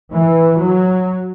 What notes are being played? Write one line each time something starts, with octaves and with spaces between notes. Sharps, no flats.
E3
F#3